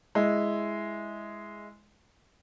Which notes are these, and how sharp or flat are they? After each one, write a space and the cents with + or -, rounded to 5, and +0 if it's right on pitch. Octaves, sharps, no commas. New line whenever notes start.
G#3 +0 E4 +0